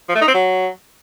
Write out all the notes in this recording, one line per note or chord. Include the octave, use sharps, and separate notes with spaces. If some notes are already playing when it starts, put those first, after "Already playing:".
F3
A3
D#4
C4
F#3